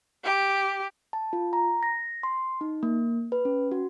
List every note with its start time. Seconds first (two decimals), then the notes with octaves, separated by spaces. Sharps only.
0.24 G4
1.13 A5
1.33 F4
1.53 A#5
1.83 A#6
2.23 C6
2.61 D#4
2.83 A#3
3.32 B4
3.45 C#4
3.72 F#4